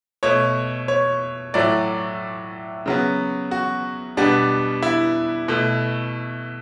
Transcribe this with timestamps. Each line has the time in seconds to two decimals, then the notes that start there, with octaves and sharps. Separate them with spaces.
0.23 B2 A3 C#5
0.88 C#5
1.54 A2 F#3 A3 D5
2.86 C#3 F#3 B3
3.51 F#4
4.17 B2 G3 B3 D4
4.83 E4
5.48 B2 A3